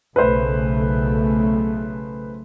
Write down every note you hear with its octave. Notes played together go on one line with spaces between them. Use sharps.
B1 C#3 A3 B4 C5